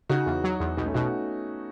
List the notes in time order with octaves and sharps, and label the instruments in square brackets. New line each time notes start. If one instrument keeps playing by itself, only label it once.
[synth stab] C#3 [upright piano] D#4 F#4
[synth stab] E2
F#3
E2
[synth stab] B1 [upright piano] B3 D#4
[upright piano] A3 C#4
[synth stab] B2 [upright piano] D#4 F#4